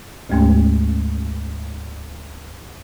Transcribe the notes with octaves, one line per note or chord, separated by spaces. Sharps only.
D2 G#2 G#3 A3 C#4